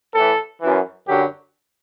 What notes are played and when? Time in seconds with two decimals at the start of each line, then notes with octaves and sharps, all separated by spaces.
0.15 A2 E3 A4
0.62 F#2 E3
1.08 F#2 D3 F#3 G4